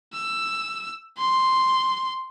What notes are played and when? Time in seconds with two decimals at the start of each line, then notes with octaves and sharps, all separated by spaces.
0.13 E6
1.18 C6